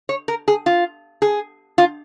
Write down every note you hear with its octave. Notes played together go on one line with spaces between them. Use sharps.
C#5
A#4
G#4
F4
G#4
F4